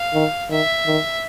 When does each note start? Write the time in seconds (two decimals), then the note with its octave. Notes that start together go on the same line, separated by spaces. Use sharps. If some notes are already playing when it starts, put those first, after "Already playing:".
Already playing: F5
0.14 D#3
0.50 D#3 E5
0.87 D#3